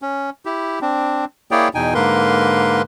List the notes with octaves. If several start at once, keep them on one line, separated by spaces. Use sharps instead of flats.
C#4
E4 G4
C4 D4
A#3 E4 G#4 C#5 D5 G5
E2 B2 D#4 G5 G#5
G#2 D3 A#3 A#4 B4 C6